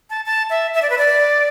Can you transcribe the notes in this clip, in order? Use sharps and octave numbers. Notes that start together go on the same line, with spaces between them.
A5
A5
E5
E5
D5
B4
D5